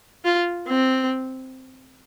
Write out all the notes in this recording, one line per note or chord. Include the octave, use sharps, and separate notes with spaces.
F4
C4